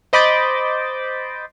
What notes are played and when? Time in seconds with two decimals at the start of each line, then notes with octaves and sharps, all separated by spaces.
0.13 C5 D#5 B5 D6 G6 A6